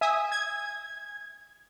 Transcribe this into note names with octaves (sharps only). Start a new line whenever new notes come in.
E5 G#5 D#6
G#6